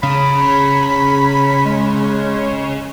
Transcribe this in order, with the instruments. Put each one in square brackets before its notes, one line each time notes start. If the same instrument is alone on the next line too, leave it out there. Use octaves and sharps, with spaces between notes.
[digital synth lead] C#3 [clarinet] B5
[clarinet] G#3